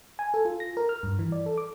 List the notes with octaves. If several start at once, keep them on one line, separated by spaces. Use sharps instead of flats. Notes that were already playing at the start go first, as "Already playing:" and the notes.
G#5
A4
F4
A#6
A#4
F6
G2
E3
D5
A4
D6